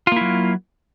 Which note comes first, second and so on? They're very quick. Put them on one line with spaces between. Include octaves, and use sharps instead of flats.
F4 A#3 E4 F#3